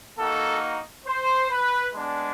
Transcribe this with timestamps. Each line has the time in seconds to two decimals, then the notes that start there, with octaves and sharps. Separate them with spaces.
0.18 A#3 D#4 F#4 A4
1.06 C5
1.50 B4
1.94 G#3 B3 D4